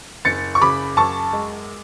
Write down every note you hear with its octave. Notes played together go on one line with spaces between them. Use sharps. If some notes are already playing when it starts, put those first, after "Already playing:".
F#1 A6 C#7
C#6
C#3 B5 D6
F#2 A5 C#6
G#3